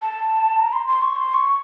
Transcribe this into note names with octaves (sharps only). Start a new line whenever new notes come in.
A5
A#5
C6
C6
C#6
C6
C#6